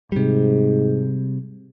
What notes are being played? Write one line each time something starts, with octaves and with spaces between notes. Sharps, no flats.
G#2 C3 G3